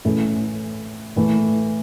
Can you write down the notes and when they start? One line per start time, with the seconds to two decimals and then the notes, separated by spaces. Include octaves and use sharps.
0.05 A2 E3 A3 C#4
1.16 A2 E3 A3